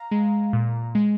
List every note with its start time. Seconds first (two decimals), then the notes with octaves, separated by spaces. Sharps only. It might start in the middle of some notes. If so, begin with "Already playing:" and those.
Already playing: F5 A#5
0.11 G#3
0.53 A#2
0.95 G#3